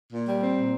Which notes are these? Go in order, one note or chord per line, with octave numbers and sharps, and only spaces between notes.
A#2
G3
C4
A#2